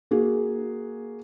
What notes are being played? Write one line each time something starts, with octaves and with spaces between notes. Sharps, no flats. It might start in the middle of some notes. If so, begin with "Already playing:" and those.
A#3 F#4 G#4